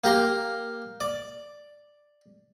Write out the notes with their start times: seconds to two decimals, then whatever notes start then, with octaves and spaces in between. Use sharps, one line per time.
0.04 A#3 G4 A#5 C6
1.01 D5